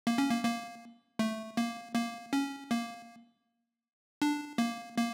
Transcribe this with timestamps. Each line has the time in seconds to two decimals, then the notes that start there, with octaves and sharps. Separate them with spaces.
0.07 A#3
0.18 C#4
0.30 A#3
0.44 A#3
1.19 A3
1.57 A#3
1.95 A#3
2.33 C#4
2.71 A#3
4.22 D4
4.58 A#3
4.97 A#3